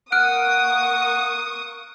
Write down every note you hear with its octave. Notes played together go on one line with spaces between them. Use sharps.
A#3 F#5 C#6 D#6 F6 F#6 D7